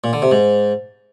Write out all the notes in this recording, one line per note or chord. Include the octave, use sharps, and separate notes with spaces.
A#2
D3
C3
G#2